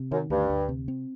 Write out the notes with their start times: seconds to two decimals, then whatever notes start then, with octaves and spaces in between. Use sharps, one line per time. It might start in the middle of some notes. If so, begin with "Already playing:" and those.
Already playing: C3
0.11 F#2 D#3
0.30 D2 G2
0.50 D2
0.69 C3
0.88 C4